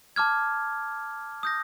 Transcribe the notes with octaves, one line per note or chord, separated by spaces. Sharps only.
A5 D6 F6 G#6
D#6 G6 A#6